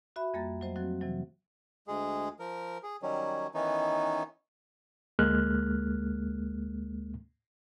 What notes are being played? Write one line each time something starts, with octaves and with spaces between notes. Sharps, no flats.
F#4 E5 B5
F2 G3 A#3 A#5 A6
F#3 A3 C5 D#5
F3 F#3 C4 F#4
C3 E3 F#3 G3
D2 G#3 G#4
F3 A#4
G#4
D#3 F#3 G3 C#4
D#3 E3 B3 C#4 D#4
D2 G#3 A#3 F6 F#6